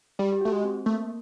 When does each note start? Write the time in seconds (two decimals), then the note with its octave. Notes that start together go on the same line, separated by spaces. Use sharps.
0.19 G3 G4
0.32 G4
0.41 A3 F#4
0.52 G#3
0.64 C4
0.86 A3 A#3